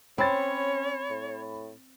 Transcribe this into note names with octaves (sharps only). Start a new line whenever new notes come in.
C4 C#4 C#5 B5 A6
A2